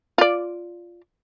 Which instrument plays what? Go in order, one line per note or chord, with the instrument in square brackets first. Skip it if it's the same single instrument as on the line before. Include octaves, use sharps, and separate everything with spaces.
[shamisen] F4 D5